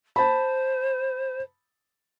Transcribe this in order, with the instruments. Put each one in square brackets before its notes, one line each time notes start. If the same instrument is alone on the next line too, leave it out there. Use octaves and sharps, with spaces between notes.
[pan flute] C5 [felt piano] A5 B5